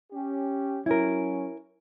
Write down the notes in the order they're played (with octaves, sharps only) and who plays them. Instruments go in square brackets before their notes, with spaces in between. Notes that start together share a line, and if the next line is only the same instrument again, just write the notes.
[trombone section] C#4 G4
[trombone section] F#3 C#4 [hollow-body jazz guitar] E4 A#4